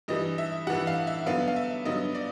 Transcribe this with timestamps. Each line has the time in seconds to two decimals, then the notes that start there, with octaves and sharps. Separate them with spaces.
0.08 G2 E3 G3 D#5
0.38 E5
0.67 G2 E3 G3 F#5
0.87 F5
1.07 E5
1.26 G2 D3 F#3 B3 F5
1.48 F5
1.56 E5
1.85 G2 D3 F#3 B3 D#5
2.15 D5